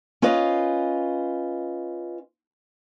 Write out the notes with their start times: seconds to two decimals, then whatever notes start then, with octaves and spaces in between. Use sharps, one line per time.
0.22 C#4 F4 B4 C5 D#5 F5